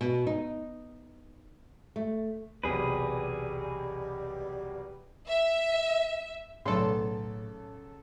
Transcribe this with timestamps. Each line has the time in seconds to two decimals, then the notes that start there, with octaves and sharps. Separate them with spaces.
0.01 B2
0.27 D#4
1.96 A3
2.63 B1 E2 C3 G3 G#4 B4
5.27 E5
6.65 B1 A2 C#3 A4 D5 C6